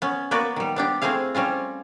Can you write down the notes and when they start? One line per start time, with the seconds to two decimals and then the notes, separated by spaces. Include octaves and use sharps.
0.02 B3 C#4
0.31 A#3 B3 F#4 B4 D5
0.56 D#3 G3
0.76 B3 D4 G4
1.02 A3 C4 E4 G#4 F5
1.35 G3 C4 C#4 F4